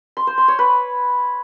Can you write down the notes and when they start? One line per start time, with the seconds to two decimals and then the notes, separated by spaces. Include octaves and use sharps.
0.17 C6
0.27 C5
0.38 C6
0.48 C#5
0.59 B4